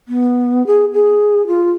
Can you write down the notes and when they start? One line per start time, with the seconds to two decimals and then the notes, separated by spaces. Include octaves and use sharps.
0.08 B3
0.67 G#4
0.93 G#4
1.47 F4